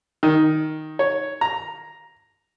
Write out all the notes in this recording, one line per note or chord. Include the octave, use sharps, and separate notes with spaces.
D#3
C#5
A#5